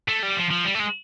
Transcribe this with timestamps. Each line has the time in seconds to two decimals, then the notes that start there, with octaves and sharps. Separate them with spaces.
0.08 A3
0.23 G3
0.37 F3
0.51 F3
0.65 G3
0.75 A3
0.79 G#3